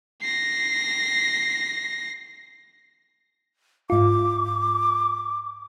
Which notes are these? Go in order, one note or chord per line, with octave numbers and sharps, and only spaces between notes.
A#6 C7
G#2 F4 D6